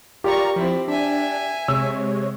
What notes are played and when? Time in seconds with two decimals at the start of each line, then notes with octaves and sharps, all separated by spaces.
0.24 F4 G4 A#4 D5 A#5 C#6
0.56 F3 C4 E4
0.88 D4 E5 G#5
1.68 C3 G#3 C#5 E6